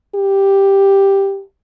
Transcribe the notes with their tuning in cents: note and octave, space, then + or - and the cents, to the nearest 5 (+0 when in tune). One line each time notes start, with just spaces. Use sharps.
G4 +0